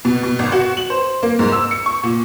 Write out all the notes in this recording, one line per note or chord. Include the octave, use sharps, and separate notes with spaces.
B2
B2
G#1
F#4
F#7
C5
A#3
G#2
E6
C#7
C#6
A#2